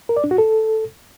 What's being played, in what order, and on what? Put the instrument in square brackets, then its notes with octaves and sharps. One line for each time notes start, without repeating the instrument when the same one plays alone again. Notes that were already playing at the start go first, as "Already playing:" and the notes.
[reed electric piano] A#4
D5
D4
F#4
A4